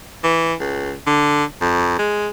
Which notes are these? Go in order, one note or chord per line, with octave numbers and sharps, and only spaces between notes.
E3
C#2
D3
F2
G#3